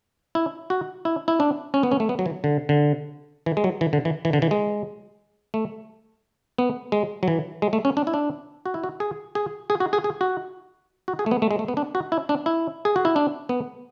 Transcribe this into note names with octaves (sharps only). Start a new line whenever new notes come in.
E4
F#4
E4
E4
D4
C#4
B3
C#4
A3
B3
F#3
E3
D3
D3
E3
G#3
F#3
E3
D3
E3
E3
D3
E3
G#3
A3
B3
G#3
F#3
E3
G#3
A3
C#4
D4
E4
D4
F#4
E4
F#4
G#4
G#4
G#4
F#4
G#4
G#4
F#4
F#4
G#4
A3
B3
A3
G#3
A3
B3
D4
F#4
E4
D4
E4
G#4
F#4
E4
D4
B3